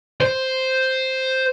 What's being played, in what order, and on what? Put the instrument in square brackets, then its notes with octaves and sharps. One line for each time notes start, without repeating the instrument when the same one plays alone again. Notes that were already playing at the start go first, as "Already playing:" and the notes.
[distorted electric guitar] C5